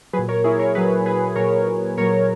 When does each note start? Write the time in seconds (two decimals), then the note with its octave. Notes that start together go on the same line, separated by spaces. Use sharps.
0.13 F#3 G#4 B4
0.19 A#2
0.29 A#4 C#5
0.44 E4 G#4
0.59 A#4 C#5
0.75 A#2 F#3 G#4 B4
1.06 G#4 B4
1.36 A#2 F#3 A#4 C#5
1.97 A#2 A#4 C#5
2.00 F#3